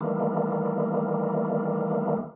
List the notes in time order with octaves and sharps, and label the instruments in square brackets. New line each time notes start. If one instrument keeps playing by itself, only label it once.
[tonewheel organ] D#3 E3 G3 A3 A#3